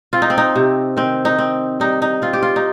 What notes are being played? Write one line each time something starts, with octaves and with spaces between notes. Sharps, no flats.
C4 F4
D#4
C4
D#4
C3
D#3 C4
D#4
C4
G3 D#4
D#4
C4 F4
G4
F4
D#4